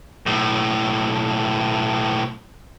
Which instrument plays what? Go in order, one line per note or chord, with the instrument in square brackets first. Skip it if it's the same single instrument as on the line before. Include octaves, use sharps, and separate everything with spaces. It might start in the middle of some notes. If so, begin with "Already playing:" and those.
[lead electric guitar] B1 A2